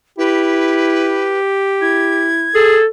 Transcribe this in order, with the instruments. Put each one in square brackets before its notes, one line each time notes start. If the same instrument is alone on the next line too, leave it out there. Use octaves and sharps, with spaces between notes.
[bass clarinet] E4 [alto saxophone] G4 [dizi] B4
[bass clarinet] E4 [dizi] G#6
[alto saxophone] G#4 [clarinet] A4